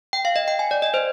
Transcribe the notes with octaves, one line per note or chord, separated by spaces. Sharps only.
G5
F5
D#5
G5
G#5
D5
D#5
C5